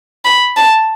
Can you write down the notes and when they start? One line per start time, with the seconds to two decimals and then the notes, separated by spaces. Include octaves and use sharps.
0.25 B5
0.57 A5